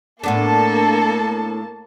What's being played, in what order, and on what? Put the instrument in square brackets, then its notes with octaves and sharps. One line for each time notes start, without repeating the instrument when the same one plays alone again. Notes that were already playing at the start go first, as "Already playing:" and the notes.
[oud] A2 B3 D4 [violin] A#3 A5 [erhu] A4